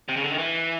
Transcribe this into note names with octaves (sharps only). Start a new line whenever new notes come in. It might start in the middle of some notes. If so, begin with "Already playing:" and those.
C3
C#3
D3
D#3
E3